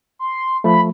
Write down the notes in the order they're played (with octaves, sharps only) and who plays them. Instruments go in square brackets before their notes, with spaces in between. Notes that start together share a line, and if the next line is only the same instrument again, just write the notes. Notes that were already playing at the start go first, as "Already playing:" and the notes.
[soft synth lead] C6
[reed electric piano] F3 A3 [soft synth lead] B5